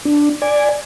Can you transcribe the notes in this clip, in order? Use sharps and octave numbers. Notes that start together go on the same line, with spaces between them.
D4
D5 G#5